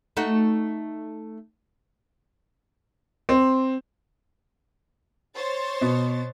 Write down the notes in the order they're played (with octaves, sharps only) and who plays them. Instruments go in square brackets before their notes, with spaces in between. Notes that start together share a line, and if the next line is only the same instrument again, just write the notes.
[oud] A3 D#4 F#4
[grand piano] C4
[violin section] C5 C#5 A6
[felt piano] B2